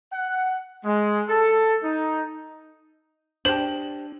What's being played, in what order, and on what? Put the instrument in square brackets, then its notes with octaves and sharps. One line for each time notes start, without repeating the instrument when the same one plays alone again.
[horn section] F#5
G#3
A4
D#4
[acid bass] D4 [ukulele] G4 C5 [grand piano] F#7